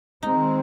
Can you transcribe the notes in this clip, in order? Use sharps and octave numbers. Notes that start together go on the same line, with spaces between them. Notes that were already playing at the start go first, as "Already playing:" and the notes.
D#3 G#3 C4 D#4